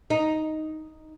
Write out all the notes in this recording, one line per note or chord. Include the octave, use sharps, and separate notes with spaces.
D#4